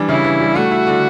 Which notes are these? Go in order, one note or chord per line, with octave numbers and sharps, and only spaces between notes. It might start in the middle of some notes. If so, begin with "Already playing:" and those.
Already playing: E3 G3 D4
C#3 E4
E3
G3
A3 F#4
E4
D3